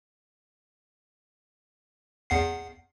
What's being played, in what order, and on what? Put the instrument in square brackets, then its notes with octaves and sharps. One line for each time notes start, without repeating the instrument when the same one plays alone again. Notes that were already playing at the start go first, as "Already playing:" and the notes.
[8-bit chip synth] E2 F#5 C7